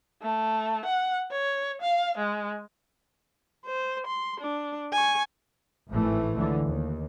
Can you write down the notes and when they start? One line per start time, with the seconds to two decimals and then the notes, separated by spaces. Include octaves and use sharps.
0.22 A3
0.85 F#5
1.31 C#5
1.81 F5
2.17 G#3
3.67 C5
4.07 C6
4.40 D4
4.93 G#5 C#6
5.90 G#1 A2 E3 A3
6.36 C#2 D3 E3
6.65 D#2